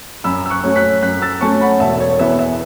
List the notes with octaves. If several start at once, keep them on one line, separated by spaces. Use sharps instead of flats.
F#2 B5 E6
E6
C#6 F#6
F#3 A3 C#4
F#6 B6
F#2 F#6 B6
E6 A6
F#3 A3 C#4 A5 C#6
F#5 B5
E1 E5 A5
C#5
E2 E3 B3 E5
E5